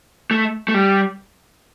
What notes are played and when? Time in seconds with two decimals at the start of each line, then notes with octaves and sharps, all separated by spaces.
0.31 A3
0.68 A3
0.74 G3